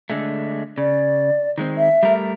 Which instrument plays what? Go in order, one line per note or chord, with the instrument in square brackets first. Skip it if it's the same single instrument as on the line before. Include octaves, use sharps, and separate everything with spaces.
[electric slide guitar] D3 G#3 A3
[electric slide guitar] C#3 [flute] D5
[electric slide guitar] D#3 G#3 C4
[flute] E5
[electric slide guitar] G3 A3 A#4